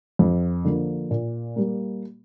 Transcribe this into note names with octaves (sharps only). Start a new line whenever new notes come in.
F2
D3 F3 A#3
A#2
G3 A#3